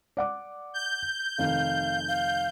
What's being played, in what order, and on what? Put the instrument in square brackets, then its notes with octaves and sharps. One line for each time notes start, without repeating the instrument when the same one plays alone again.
[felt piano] D5 F#5 D6
[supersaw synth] G6
[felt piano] F1 D#3 [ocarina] F5
[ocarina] F5